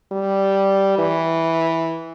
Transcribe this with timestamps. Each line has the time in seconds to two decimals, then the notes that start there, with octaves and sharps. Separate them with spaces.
0.12 G3
0.98 E3